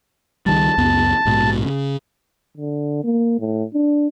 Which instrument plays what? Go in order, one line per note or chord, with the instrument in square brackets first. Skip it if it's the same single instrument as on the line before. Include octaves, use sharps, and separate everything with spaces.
[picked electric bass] C#2 D#3 G3 [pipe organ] A5
[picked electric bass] C#2 F#2 B3
A#1 G#2 B2
C#3
[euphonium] D3
A#3
A2
D4